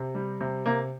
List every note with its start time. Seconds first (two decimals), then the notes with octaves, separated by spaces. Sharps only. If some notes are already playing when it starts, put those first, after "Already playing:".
Already playing: C3
0.15 G3
0.41 C3
0.66 C3 A#3